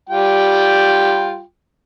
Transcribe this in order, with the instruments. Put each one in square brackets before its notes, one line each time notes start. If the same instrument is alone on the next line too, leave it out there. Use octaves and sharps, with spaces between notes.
[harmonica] G3 F4 G5